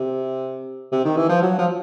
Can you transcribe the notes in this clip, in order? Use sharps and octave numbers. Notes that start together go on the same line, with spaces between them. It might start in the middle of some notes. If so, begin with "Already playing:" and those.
Already playing: C3
C3
D#3
E3
F3
F#3
F3